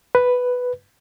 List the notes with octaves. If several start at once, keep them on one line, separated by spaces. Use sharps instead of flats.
B4